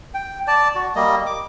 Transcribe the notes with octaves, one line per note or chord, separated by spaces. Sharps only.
G5
D5 A5
F#4
G3 A#3 D#5
D6